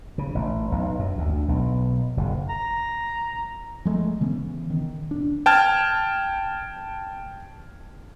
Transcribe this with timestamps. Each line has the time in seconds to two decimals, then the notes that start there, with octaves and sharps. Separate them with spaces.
0.18 C#3
0.35 A1
0.72 B1
0.99 F#2
1.18 D2
1.48 B1
2.17 F#1
2.49 A#5
3.85 F3 G#3 A3
4.21 C#3 E3 B3 C#4
4.70 D#3
5.11 E1 D4
5.46 G5 A5 F6 G#6